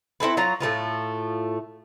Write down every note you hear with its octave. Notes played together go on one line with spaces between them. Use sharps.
C4 E4 A4 B4
F#3 F4 A#5
A2 A3 B3 F4